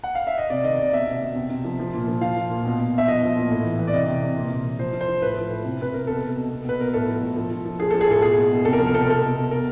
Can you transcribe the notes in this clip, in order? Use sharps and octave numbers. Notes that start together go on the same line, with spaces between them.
F#5
F5
E5
D#5
C3 D5
D#3 D#5
C3 D5
B2 E5
B2
B2
C3
C3
F3
F3
A#2
F3
F3 F5
F3
A#2
B2
B2
B2
E5
F3 D#5
F3
A#2
A2
E3
E3
D5
C3 D#5
C3
C3
A#2
A#2
A#2
F3 C5
F3
C5
F3
A2 B4
F3
A2
C3
C3 B4
C3 A#4
B2 A4
B2
B2
B2
B2 B4
B2 A#4
A2 A4
F3
A2
F3
F3
F3
F3 G#4
F3 A4
G#4
A2 A4
B2 G#4
B2
B2
C3 A4
A#4
F3 A4
A#4
C3 A4
A#4
B2 A4
B2
B2
B2 A#4